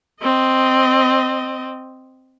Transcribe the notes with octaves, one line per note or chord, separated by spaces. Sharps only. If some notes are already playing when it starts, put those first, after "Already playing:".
C4 D#5